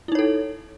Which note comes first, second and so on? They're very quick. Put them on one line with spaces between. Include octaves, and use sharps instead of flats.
E4 D#4 C#5 A4